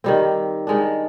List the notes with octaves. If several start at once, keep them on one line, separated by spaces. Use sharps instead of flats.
D#3 G3 C4
D#3 G#3 D4